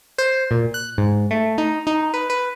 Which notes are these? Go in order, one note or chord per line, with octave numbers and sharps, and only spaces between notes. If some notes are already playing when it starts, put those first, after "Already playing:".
C5
A#2
F#6
G#2
A3
D#4
D#4
B4
B4